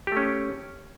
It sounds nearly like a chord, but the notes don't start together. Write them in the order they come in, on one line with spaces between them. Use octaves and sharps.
G4 A3 C#4